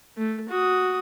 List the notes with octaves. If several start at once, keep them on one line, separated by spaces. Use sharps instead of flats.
A3
F#4 D#6